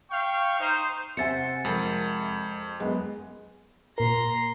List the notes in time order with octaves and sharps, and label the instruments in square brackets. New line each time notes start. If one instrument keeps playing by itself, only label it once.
[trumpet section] F5 G5 C#6
D#4 C5
[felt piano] C3 E5 G#5 [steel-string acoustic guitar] C5 [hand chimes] F#5 A6 C#7
[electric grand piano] F2 [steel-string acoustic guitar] G#3 A#4
[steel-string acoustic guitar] F#2 [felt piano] G#3 B3
[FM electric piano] A#2 A#4 [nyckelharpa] A#5 C6